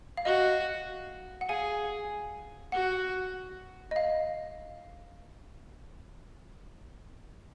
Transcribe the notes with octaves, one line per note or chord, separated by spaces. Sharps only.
F5
F#4 D#5
F#5
G#4 F5 G#5
F#4 F#5
D#5
F5